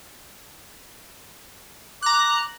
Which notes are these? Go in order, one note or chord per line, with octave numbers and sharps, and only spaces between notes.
A#5 D6 F#6